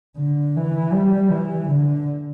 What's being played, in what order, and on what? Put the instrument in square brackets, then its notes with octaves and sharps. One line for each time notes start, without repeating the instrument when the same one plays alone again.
[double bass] D3
E3
G3
E3
D3